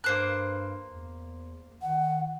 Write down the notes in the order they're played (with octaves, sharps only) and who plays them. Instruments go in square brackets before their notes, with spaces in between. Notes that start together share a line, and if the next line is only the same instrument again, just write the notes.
[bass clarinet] G2 [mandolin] A#3 C5 F#6
[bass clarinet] E2
[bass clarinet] D#3 [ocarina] F#5